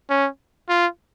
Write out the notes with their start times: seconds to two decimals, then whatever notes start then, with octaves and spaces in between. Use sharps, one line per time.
0.10 C#4
0.69 F4